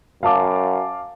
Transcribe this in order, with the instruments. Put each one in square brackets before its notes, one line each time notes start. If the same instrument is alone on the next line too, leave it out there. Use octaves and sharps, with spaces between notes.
[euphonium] F#2 [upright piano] F5 A5 D6